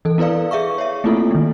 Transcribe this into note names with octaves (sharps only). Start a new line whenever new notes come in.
E3 A4
B3 E4 B4 D5 F5
G#4 E5 F5 C#6
C#5 E5
A3 A#3 C4 E4 F4 A4
D#3 G#3